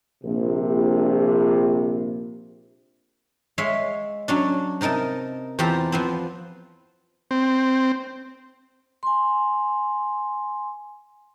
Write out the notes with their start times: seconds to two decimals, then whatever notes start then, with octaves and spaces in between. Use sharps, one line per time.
0.24 A#1 C3
3.58 G#3 C#5 E5 F5
4.28 F#3 C#4 D4
4.81 C3 D#4 A#4 D#5 A5
5.59 E2 C4 F4 G4 A5 A#5
5.92 F3 B3 C4
7.31 C4
9.03 G#5 C6